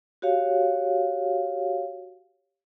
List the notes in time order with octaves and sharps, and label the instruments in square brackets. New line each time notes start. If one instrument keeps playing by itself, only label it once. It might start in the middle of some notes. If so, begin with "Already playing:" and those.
[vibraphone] F#4 G4 C#5 F5